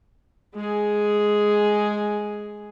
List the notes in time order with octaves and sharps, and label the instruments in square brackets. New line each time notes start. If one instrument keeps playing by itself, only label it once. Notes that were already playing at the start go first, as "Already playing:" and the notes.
[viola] G#3 G#4